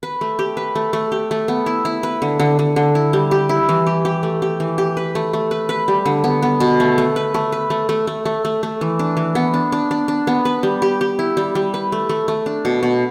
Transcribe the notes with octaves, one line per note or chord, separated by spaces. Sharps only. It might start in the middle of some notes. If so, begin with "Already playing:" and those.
B4
A3
G4
B4
A3
A3
G4
A3
B3
E4
E4
B4
D3
D3
D3
D3
E4
G3
G4
E4
E3
G4
G4
A3
G4
E3
G4
B4
A3
A3
B4
B4
G3
D3
B3
B3
B2
A3
A3
B4
A3
B4
A3
A3
A3
A3
A3
A3
E3
D4
E3
B3
D4
D4
D4
D4
B3
B4
G3
G4
G4
E4
G3
G3
B4
A3
A3
A3
D4
B2
B2